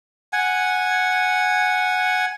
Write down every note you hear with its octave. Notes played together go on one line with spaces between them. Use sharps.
F#5 G#5